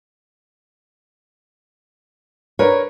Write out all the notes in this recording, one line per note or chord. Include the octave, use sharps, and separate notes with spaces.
D4 A#4 B4 C#5